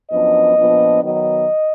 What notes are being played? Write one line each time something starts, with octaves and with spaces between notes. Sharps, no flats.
F#2 F3 B3 D4 D#5
A#2 F3 B3 D4
D#3 F#3 B3 D#4 D#5